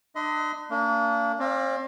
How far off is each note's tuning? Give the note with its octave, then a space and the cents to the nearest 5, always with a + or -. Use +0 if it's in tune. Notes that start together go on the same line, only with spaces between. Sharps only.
D4 +40 D#5 +30 C6 -35
A#3 -30 D4 -30
C4 +40 D5 +0 F5 +0